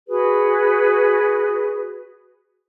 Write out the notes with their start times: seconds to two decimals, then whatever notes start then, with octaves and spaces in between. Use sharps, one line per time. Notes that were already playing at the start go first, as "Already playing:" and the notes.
0.08 F#4 G#4 B4